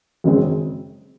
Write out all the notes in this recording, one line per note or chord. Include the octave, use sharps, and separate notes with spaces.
G#1 F#2 C#3 G#3 C4